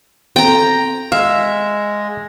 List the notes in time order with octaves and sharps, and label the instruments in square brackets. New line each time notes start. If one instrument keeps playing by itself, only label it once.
[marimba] C4 A4 [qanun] G5 A#5
[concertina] G#3 [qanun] E5 [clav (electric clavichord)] F5